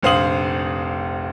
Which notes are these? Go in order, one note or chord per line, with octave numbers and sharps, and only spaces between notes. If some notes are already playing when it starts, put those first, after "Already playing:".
F1 A#1 C5 F5 D#6 F#7